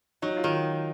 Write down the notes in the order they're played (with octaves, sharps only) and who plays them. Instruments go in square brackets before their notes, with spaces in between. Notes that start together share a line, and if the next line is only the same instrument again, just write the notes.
[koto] F#3 [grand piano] D#4
[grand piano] F4
[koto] D#3